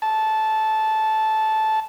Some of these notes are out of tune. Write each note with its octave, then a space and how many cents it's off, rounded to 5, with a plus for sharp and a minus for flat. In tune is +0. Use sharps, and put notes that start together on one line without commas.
A5 -10